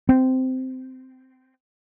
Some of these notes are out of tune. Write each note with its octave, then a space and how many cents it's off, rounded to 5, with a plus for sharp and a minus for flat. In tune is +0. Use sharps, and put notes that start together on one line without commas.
C4 -15